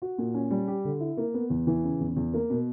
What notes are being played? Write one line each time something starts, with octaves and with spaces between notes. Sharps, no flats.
F#4
A#2
C#4
G3
G4
D3
E4
A#3
B3
E2
E3
C#3
E2
E2
A#3
B2